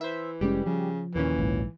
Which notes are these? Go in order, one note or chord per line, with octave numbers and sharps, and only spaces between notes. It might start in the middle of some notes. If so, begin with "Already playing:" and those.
E3 C5 E5
F1 G3 G#3 C#4 G4
C#3 F3
D#2 A#2 E3 C#4
A#1 G#2